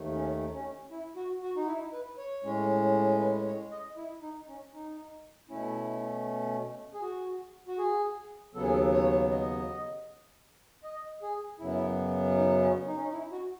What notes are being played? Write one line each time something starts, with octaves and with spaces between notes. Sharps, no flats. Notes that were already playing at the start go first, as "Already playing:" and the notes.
Already playing: D#2 D#3 A3
C#4
C#4
E4
F#4
F#4
D#4
E4
B4
C#5
A2 G#3 C#4
B4
C#5
D#5
E4
D#4
C#4
D#4
B2 A3 C#4 E4
G#4
F#4
F#4
G#4
D#2 C#3 F#3 B3 A4
G#4
A4
C#5
D#5
D#5
G#4
F#2 C#3 F#3 B3 E4
D#4
C#4
D#4
C#4
D#4
E4
F#4